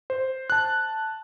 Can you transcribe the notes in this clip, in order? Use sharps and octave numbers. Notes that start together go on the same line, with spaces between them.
C5
A5 F#6